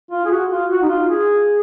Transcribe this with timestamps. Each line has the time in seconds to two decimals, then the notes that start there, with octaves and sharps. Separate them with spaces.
0.11 F4
0.25 G#4
0.31 F#4
0.51 F4
0.70 F#4
0.82 D#4
0.89 F4
1.09 G#4